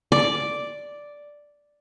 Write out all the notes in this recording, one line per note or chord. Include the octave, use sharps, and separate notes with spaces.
D5